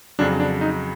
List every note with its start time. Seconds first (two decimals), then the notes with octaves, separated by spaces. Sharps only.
0.19 F2 C#3 F#3 D4
0.40 D4
0.61 D#4